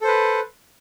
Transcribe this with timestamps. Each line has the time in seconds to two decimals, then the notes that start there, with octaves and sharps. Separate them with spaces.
0.01 A4
0.04 C5
0.07 B4